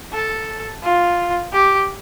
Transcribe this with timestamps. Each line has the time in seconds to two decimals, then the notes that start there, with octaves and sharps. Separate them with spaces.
0.13 A4
0.83 F4
1.53 G4